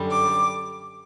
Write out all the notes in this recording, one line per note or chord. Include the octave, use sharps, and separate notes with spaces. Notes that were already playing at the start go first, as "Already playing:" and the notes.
Already playing: F#2 D3 G3
D6